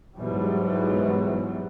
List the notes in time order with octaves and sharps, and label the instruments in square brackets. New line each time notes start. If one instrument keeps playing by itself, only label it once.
[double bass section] G#2 B2 E3 F#3 G3